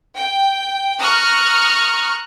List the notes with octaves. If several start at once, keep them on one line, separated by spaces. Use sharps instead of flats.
G5
A#5 C#6 D#6 F6 F#6